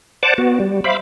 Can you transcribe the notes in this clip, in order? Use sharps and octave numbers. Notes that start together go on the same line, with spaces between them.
C5 D5 F#5 A5 D6
B3 F#4
G3
C5 E5 F5 B5 D6